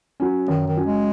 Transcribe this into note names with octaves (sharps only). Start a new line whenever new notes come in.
F#3 C#4
F#2 D#3
D#3
F#3 C#4
G#3